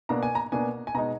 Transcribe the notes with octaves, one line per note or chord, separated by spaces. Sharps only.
B2 A#3 D4 A#5
G#5
A#5
B2 A#3 D4 G#5
G#5
B2 G#3 D#4 A#5